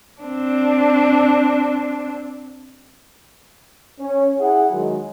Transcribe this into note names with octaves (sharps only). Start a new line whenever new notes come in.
C4 D4
C#4 C#5
E4 G#4 F#5
D#3 F#3 G#3